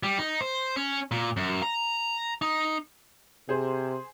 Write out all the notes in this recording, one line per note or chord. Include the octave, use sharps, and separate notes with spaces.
G3
D#4
C5
C#4
A#2
F#2
A#5
D#4
C3 G#4 C5